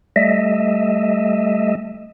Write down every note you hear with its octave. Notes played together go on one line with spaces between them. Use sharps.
G3 A3 D#5 E5